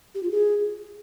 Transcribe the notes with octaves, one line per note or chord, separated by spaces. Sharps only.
G4
F4
G#4